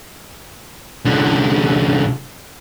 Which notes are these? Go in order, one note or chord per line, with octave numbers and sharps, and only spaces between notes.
C2 D3